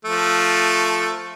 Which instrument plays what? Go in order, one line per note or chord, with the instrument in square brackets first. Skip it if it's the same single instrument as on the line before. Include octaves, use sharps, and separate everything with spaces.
[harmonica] F3 A3